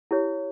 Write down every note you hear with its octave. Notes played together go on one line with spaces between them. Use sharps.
E4 G4 C#5